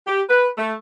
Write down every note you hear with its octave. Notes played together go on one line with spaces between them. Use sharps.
G4
B4
A3